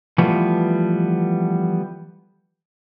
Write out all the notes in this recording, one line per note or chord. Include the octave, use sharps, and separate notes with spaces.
E3 F3 G3 A3 B3